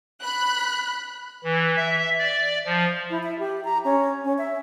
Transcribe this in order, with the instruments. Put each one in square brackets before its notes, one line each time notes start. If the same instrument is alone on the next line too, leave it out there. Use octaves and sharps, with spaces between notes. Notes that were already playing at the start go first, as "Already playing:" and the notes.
[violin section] B5 F#6
[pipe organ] E3
E5
D5
F3
[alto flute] E4
E5
G4
A#5
C#4
C#4
E5